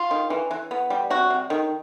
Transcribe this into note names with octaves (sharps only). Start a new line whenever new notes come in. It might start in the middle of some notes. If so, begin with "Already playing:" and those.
Already playing: F4
D#3
E3
E3
B3
G3
C3 F#4
C3
D#3